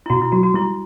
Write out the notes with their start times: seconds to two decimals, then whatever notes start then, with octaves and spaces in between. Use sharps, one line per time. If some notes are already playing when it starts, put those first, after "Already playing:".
0.06 E4
0.10 B2 F#4
0.22 E4
0.32 F#3 F#4
0.43 F#4
0.54 G3 E4